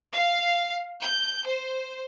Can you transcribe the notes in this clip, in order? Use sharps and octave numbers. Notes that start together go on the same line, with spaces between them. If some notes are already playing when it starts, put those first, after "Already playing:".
F5
G6
C5